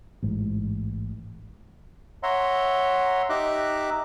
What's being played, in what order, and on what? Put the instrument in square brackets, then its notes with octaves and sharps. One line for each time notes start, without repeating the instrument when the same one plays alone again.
[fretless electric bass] A1 G#2
[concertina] C#5 E5 F#5 A#5 C6
D#4 G4 E5 A#5 D6 F#6